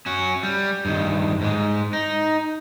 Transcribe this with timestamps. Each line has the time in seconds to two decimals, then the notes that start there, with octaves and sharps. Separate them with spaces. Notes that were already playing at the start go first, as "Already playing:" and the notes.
0.06 C#4 F#4
0.43 G3
0.85 G2 D#3
1.41 G#2 G#3
1.93 D#4